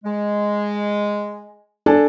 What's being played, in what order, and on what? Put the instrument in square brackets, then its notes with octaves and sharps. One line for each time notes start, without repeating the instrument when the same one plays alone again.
[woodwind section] G#3
[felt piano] D4 A4 G#5